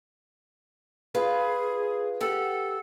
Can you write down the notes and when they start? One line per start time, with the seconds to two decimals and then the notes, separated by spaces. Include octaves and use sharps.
1.15 F4 G#4 B4 F5
2.21 G4 A4 F#5